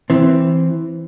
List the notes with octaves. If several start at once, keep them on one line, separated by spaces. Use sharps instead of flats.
E3 C4